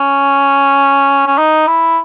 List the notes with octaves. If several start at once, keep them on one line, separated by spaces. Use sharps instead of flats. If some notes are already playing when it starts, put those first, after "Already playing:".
Already playing: C#4
C#4
D#4
E4